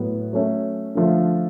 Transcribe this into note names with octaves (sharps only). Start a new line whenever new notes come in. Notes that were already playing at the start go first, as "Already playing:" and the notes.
Already playing: A2 F#3 B3
F#3 A3 C#4
D3 F3 A3 F4